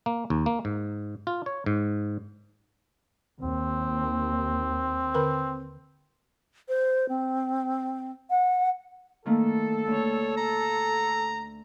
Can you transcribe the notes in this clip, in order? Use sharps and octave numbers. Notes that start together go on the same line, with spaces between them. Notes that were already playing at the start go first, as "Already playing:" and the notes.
A#3
D#2
A#3
G#2
F4
C#5
G#2
D#2 C4
D3 A#4 B4
C5
C4
F#5
D#3 A3 A#3 A4
D2 A3 C#5
A#5